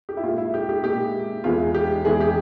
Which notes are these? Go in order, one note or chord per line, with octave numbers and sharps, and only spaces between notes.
G4
E4
A#2 G#3 F4
E4
G4
G4
A#2 G#3 G4
E2 E3 G#3 F4
G4
E2 E3 G#3 G#4
G4